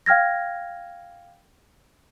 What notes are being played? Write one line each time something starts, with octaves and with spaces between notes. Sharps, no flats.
F5 G5 F6 G#6 A#6